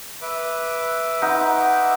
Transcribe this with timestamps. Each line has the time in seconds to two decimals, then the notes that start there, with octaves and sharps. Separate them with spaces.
0.22 B4 E5 D6
1.22 D#4 F#5 C6